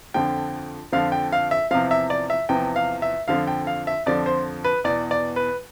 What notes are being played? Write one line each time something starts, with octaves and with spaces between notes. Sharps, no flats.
F2 D3 F3 G5
F2 D3 F3 F5
G5
F5
E5
E2 C3 F3 F5
E5
D5
E5
E2 C3 F3 G5
F5
E5
F2 D3 F3 F5
G5
F5
E5
F2 D3 F3 D5
C5
B4
E2 B2 D5
D5
B4